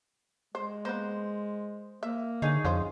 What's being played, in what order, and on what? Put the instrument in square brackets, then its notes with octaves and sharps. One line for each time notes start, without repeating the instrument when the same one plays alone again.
[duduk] G#3 [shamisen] C5
[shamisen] A#3 B3 [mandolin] C5
[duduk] A#3 [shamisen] E5
[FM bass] D3 [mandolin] D#4 G#4 C#5
[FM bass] F2 [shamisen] C#4 F4 C5